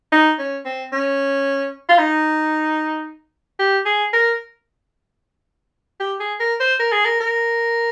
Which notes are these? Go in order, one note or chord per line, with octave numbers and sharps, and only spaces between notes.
D#4
C#4
C4
C#4
F4
D#4
G4
G#4
A#4
G4
G#4
A#4
C5
A#4
G#4
A#4
A#4